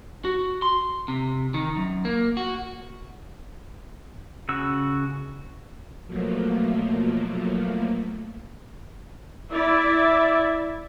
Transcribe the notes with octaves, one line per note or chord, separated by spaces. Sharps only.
F#4
C6
C3
D#3
F#2
A#3
F#4
C#3 F#4 E6
B2 F3 F#3 A3 A#3
E4 D5 E5